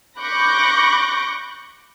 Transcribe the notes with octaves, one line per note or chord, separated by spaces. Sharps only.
B5 C#6 D6 F#6 G6 A#6